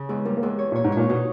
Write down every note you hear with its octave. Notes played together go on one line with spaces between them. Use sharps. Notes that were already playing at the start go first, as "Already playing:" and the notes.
Already playing: C#3
E2 G#3
G3 A#3
A#3
E2 G#3
C#5
A#2
C#5
G#2
A#2 C#5
B2 D#4